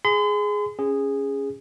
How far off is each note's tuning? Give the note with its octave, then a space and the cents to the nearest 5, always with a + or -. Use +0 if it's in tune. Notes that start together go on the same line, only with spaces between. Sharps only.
G#4 +0 C6 -45
C#4 +0 G#4 -15